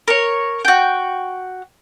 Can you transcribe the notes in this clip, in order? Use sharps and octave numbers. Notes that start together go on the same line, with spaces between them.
A#4 C#5
F#4 G5